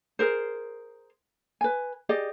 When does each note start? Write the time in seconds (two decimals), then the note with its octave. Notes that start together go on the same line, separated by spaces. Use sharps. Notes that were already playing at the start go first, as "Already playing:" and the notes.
0.19 G#4 A#4 C5
1.61 B4 G#5
2.09 G4 G#4 D5 D#5